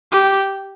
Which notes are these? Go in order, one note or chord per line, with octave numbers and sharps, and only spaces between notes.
G4